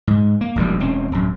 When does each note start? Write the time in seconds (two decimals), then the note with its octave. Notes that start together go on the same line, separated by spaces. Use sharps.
0.07 G#2
0.41 A#3
0.56 E1 A#1 F#2 G3
0.80 E1 C4 C#4
1.12 D1 F#2